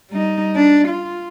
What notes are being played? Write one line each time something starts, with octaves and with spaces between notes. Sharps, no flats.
G3 D#4
D4
F4